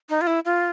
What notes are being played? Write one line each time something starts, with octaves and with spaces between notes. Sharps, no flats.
D#4
F4
E4
F4